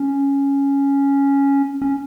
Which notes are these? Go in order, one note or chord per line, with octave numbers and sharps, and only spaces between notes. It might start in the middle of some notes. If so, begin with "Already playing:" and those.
Already playing: C#4
C#4